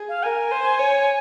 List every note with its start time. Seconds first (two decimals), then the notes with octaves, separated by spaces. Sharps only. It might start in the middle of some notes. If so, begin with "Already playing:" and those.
Already playing: G#4
0.09 F5
0.23 A#4 G#5
0.52 C5
0.79 C#5